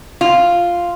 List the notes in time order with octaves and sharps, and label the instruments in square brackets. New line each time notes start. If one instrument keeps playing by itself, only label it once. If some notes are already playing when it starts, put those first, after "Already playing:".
[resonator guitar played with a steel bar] F4